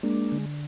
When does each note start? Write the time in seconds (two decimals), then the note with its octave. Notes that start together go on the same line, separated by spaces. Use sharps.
0.03 G#3 A#3 D4
0.32 D3